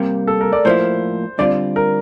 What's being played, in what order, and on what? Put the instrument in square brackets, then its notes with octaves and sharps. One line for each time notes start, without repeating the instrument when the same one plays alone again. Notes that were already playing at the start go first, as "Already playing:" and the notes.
Already playing: [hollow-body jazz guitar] C3 G3 A#3
[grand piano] A4
A#4
D5
[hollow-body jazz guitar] A2 F3 A#3 E4 [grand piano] C5
[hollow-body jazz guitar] D3 G3 C4 F4 [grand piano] D5
[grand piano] A#4